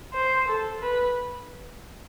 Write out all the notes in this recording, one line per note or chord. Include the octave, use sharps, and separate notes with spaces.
C5
A4
B4